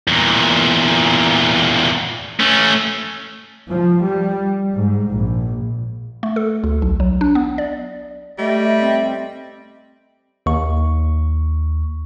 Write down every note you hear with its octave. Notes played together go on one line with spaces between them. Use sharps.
E2 A#2
A3 C#4
F3
G3
G#2
A#1
A3
A4
D2
B1
F#3
D4
B3
D5
G3 A3 D#5 E5
C4
D#2 C#6